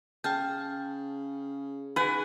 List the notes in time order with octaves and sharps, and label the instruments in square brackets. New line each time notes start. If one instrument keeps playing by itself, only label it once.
[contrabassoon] C#3 [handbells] G5 F6 G6 [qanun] A5
[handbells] D#4 G#4 [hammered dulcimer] B4 [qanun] F#5 G#5